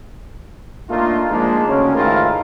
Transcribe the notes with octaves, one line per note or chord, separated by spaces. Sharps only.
A3 A#3 D4 D#4 F4
F3 G#3 A#3 D4 D#4
D2 C#3 C#4
G#2 D#3 A3 E4 F4 A#4